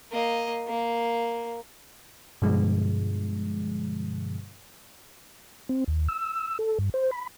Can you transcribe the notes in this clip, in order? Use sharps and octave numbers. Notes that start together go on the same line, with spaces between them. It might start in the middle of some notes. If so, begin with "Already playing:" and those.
A#3 D#5
A#3
G2 B2 D3 F3 G#3
C4
D#2
E6
A4
G2
C5
B5